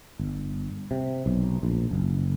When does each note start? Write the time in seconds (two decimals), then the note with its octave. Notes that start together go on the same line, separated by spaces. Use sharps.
0.19 G1
0.91 C3
1.26 B1
1.63 A#1
1.91 F#1